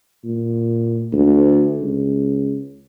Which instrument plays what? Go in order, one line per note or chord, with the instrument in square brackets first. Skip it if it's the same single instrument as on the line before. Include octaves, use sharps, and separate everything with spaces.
[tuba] A#2
D2
C#2